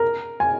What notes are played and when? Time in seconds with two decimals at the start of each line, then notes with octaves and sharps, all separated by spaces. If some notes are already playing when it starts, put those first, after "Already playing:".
Already playing: A#4
0.40 G#5